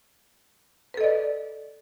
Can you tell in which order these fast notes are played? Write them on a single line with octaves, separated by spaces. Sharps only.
B4 A4 D#5 D5